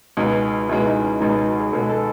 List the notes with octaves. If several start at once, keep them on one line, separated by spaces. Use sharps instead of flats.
C#2 B2 G#3 D#4
C#2 B2 G#3 E4
D#4
C#4
C#2 B2 G#3 D#4
F#4
G#4
C#2 B2 G#3 A4
A4